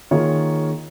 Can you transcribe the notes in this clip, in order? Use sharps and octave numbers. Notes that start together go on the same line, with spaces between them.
D#3 A#3 F4 G#4 C#5